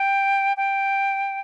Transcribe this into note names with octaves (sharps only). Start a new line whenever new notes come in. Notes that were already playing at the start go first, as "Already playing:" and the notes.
Already playing: G5
G5